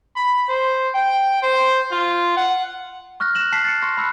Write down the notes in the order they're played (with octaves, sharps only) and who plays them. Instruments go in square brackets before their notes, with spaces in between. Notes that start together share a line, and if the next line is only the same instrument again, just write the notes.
[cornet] B5
C5
G5
C5
F4
F#5
[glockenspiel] C#6 F6 F#6 A#6
F#6 A#6 E7 F#7
A5 B6 C7
A6 B6 C#7
C6 C#6 A#6
B5 E6 F#6 C#7